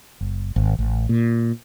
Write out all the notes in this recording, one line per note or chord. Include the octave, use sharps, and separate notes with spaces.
F#1
G#1
A1
A#2